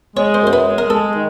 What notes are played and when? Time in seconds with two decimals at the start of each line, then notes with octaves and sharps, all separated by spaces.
0.16 G#3 C#5
0.34 C5
0.42 F#2
0.47 C5
0.53 B4
0.66 G#3
0.78 A#4
0.90 G#3 A4
1.14 D#3